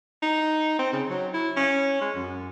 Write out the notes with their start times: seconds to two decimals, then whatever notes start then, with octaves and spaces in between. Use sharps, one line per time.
0.22 D#4
0.79 C4
0.93 C#3
1.10 F#3
1.34 E4
1.56 C#4
2.01 G#3
2.15 F#2